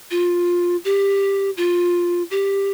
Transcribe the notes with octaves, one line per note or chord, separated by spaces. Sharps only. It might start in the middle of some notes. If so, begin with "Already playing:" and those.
F4
G4
F4
G4